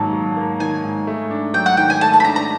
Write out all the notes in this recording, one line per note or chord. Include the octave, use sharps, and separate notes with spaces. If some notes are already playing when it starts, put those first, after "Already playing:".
Already playing: G#2 D#3 F#3 A#3 A5
F#3
A#3
D#3 G#5
G#2
A3
D4
F#3 G5
F#5
D#3 G5
G#5
A3 A5
A5
B5
D4 A#5
A#5